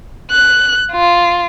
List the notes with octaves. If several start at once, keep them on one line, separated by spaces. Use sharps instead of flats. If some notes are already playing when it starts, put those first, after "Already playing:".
F#6
F4